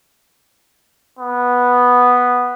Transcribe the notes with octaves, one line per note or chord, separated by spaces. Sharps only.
B3